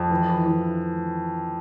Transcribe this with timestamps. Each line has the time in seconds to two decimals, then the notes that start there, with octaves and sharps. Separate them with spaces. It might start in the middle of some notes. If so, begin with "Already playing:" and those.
Already playing: F2
0.10 E3
0.29 E3
0.46 E3